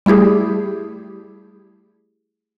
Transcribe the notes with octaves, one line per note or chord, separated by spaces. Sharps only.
G3 A3 E4 G4 G#4